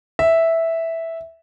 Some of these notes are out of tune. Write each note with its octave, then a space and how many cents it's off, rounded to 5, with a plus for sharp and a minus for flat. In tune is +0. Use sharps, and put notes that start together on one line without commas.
E5 -5